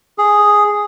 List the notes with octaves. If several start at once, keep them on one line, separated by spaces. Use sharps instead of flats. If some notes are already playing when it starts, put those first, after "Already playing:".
G#4